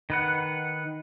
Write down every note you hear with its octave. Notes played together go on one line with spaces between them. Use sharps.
D#3 B4 F#5